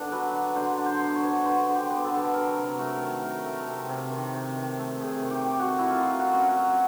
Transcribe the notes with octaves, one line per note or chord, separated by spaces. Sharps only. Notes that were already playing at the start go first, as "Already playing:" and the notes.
Already playing: D3 B3 D4 G#4
F#3 B4
D4
D3 C5
D4
C5
B3
C#5
B3
D3 C5
D3
G4
B3
A4
D3
F#3 A#4
C3
A3 A#4
D#3
A3 A#4
A3
C3
C3
D#3
C3
D#3
A3
C3 G#4
D#3
G4
D#3
F#4
A3
E4
F#3 F4
F#3
F#4
C#4
F#4
F#3